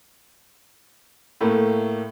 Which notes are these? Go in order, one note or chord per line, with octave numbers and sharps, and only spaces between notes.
A2 A3 A#3